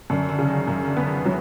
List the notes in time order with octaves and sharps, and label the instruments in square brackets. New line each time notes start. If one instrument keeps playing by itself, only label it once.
[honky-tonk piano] F#2 [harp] D3
[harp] D3
[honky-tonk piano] C#3
[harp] D#3
[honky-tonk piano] F#2 [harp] D#3
[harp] D3 D#3
[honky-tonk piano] B3
[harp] D#3
[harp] E3 [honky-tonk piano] F#3